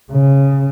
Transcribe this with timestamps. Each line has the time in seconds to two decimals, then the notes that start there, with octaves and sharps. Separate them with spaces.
0.11 C#3